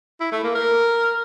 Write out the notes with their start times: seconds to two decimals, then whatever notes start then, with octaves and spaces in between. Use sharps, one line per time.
0.21 E4
0.32 A3
0.44 A#3
0.55 A#4